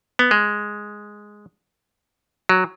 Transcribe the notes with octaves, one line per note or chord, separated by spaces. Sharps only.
B3
G#3
F#3